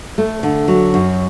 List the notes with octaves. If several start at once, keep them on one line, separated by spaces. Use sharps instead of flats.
A3
D3
F#3
F#2